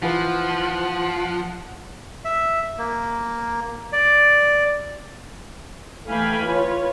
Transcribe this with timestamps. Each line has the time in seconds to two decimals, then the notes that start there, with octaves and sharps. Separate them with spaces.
0.02 E3 F3 F4 B4 F#5
2.25 E5
2.78 A#3
3.93 D5
6.08 E3 A3 F5 G5 G#5 B5
6.47 F4 B4 C#5